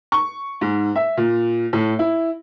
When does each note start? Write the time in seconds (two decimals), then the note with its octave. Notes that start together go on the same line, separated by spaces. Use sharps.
0.12 C#6
0.61 G#2
0.96 E5
1.17 A#2
1.73 A2
1.99 E4